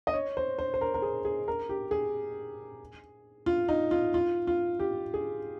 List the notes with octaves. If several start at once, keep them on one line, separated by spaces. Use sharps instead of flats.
D#5
C#5
C5
C5
C5
A#4
A#4
G#4
G#4
A#4
G4
G#4
F4
D#4
F4
F4
F4
G4
G#4